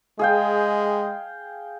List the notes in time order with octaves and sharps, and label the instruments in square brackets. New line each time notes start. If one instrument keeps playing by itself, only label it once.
[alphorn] G#3 [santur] G#4 F5 G5